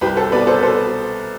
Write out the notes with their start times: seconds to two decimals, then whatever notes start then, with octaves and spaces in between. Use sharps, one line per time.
0.01 C2 G4 B4
0.16 A4 C5
0.32 B2 B3 B4 D5
0.47 A4 C5
0.63 A4 C5